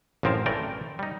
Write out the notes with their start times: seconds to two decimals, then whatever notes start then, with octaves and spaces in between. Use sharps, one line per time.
0.23 A1 F#2 F3 C4 A#4 A5
0.46 E3 A3 A#4 D5 G5
0.99 G3 D#4